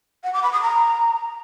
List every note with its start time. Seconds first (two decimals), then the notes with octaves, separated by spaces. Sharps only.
0.24 F#5
0.33 D6
0.43 B5
0.53 D#6
0.62 A#5